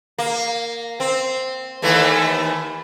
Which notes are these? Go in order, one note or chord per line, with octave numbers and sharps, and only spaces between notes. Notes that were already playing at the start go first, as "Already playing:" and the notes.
A#3
C4
D#2 E3 A3